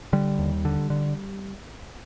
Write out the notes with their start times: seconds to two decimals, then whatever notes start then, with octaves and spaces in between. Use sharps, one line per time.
0.13 D3 G3
0.39 D#2
0.65 D3
0.90 D3